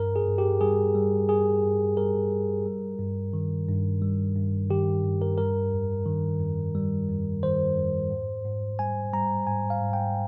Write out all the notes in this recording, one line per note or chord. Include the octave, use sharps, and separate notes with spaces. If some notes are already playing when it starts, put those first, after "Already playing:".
Already playing: G2 A#4
G#4
G2
G4
G3 G#4
G3
G2 G#4
G2
G3 A#4
G3
G3
G2
D#3
G2
G3
G2
D#3 G4
G2
A#4
G3 A#4
F2
D#3
F2
G3
F2
D#3 C5
F2
G#2
G#2
G3 G#5
G3 A#5
G#2 G#5
F5
G#2
G5